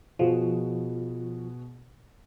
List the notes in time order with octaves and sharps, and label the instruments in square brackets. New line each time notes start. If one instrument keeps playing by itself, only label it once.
[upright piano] B2 F#4 G#4 [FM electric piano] F3